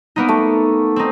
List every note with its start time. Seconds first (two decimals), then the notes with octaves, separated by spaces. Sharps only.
0.16 A#3 B3 D#4
0.29 A3
0.96 C4 D#4